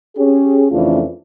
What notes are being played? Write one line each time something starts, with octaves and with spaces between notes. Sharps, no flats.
C#4 G4 G#4
F2 C#3 E3 A3 D4 F4